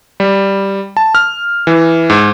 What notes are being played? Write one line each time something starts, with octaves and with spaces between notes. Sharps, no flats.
G3
A5
F6
E3
G#2